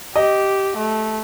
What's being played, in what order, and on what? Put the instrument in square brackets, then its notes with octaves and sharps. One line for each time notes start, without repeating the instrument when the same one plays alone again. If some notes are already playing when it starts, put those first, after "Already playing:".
[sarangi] G4 [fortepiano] D#5
[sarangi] A3